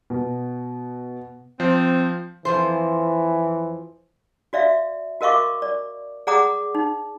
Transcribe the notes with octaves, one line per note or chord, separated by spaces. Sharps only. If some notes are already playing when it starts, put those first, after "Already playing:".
B2
F3 C4 C5
F2 E3 F3 C5
F#4 D5 E5 F5
F#4 A#4 D#5 F5 C#6 D6
D5
G#4 D5 F#5 A#5 D6 D#6
D#4